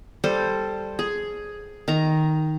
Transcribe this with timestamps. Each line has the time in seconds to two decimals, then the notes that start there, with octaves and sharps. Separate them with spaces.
0.24 G3 A4 C5
0.99 G#4
1.88 D#3 A#5